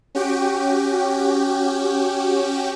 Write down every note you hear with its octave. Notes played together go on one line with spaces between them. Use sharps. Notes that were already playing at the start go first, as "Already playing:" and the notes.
C#4 F#4 G4 G5